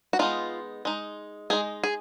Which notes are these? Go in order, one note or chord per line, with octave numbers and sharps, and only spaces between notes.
F#4
G#3 B3 D#4 F4
G#3 D#4
G#3 D#4 G#4
G#4